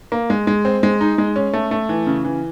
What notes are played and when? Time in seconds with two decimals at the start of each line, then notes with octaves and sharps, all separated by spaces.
0.12 A#3
0.30 G#3
0.47 G#3
0.65 C4
0.83 G#3
1.01 D#4
1.18 G#3
1.36 C#4
1.53 A3
1.71 A3
1.89 E3
2.07 C#3
2.25 E3